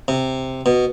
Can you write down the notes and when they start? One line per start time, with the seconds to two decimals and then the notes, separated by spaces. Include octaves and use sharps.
0.08 C3
0.66 B2